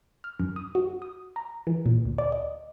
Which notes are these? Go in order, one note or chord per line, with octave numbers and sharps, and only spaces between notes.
F6
F#2
D#6
F#4
D#6
A#5
E3
A#2
D2
D5
D#5